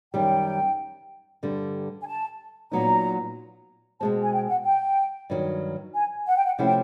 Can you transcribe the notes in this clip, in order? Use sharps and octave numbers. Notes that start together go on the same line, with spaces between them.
F#2 D#3 G3 G5
G2 D3 G3
G#5
A5
A#2 F#3 B3 D#4 A#5
B2 G#3 C4 A5
G#5
G5
F#5
G5
G2 D#3 F#3
G#5
F#5
G5
F#5
C3 F3 A3 C#4 E4 F#5
G5